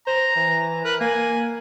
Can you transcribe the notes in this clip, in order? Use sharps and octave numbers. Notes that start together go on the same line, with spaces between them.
C5 A#5
E3
A#4 B4
A#3 G#5